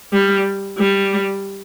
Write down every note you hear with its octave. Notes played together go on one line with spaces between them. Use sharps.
G3
G3